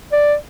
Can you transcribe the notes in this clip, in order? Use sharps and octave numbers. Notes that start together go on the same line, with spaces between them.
D5